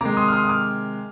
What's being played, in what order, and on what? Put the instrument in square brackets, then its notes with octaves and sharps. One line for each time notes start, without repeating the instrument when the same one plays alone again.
[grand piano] C3 D#3 G#3 A#5 D6
C6 D#6
F6
C6 D#6
D#6
D6 F6